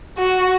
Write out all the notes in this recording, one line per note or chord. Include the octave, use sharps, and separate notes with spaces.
F#4